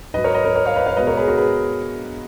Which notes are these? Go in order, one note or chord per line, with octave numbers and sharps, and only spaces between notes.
G#2 F#3 B4 D#5
A#4 C#5
B4 D#5
A#4 C#5
A#4 C#5
C#5 F5
B4 D#5
C#5 F5
B2 G#3 B4 D#5
A#4 C#5
G#4 B4
F#4 A#4
G#4 B4